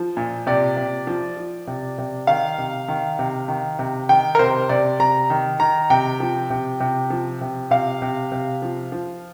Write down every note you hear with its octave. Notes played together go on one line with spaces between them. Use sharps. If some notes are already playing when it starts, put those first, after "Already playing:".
Already playing: F3
A#2
C3 D5
C3
F3
F3
C3
C3
D#3 F5
C3
D#3
C3
D#3
C3
D#3 G5
A#4
C3 C5
C3 D5
C3 A#5
D#3
D#3 A#5
C3 G5
F3
C3
C3
F3
C3
C3 F5
C3
C3
F3
F3